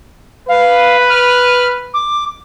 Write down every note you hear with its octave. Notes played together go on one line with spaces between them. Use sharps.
B4 F5
F6
D6